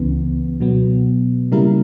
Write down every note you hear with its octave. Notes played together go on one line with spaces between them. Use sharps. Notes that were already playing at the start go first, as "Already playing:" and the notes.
Already playing: C#2 C#3 E3 B3
B2 F#3 B3
C#3 G3 A#3 E4 A#4